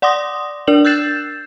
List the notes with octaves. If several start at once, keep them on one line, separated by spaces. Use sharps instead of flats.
D5 F#5 C6 D6 D#6 A#6
D4 A#4 D5 F#7
E6 F#6 G6 A6 C7 E7